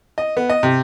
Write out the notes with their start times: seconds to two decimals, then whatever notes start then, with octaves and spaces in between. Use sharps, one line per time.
0.18 D#5
0.37 B3
0.50 D#5
0.63 C3